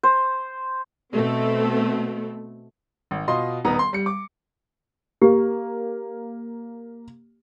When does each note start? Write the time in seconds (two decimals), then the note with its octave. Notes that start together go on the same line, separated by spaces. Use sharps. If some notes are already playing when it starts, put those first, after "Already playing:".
0.03 C5
1.15 B2 A3 C4
3.11 G#1
3.28 B2 F4 D#5 C6
3.65 D#1 B3 D#4 A#5
3.79 C6
3.93 G3 C#7
4.06 D6
5.22 A#3 G4